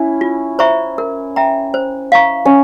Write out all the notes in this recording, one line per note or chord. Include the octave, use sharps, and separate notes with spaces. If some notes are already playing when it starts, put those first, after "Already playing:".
Already playing: C#4 E4
F4
C5 E5 A#5 C#6
A#4
E5 G5 A#5
C5
F5 A#5 C#6
C#4